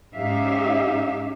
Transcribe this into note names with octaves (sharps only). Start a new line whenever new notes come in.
G#2 C#4 D#4 G4 E5 F5